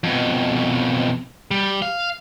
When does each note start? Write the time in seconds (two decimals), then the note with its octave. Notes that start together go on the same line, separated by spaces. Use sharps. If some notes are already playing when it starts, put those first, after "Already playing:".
0.04 F2 B2
1.51 G3
1.82 F5